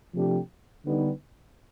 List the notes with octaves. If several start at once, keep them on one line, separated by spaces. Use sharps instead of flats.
C3 F3 A3 D4 G4
D3 G3 B3 D#4